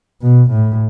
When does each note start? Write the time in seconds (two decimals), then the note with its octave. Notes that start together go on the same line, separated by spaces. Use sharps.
0.22 B2
0.50 A2